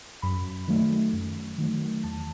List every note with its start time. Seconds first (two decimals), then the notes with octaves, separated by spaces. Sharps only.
0.22 F#2 B5
0.68 D#3 F#3 A3
1.13 F#2
1.58 D#3 F#3 A3
2.04 E2 A5